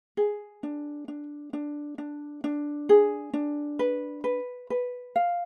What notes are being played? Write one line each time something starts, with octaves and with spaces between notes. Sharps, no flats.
G#4
D4
D4
D4
D4
D4
G#4
D4
B4
B4
B4
F5